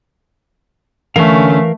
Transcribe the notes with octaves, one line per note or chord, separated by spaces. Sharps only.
D3 E3 A3 C#4 A#4 F5